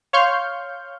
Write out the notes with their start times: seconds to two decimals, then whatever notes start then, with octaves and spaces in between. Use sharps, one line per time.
0.13 C#5 F5 C6 C#6 F6 G6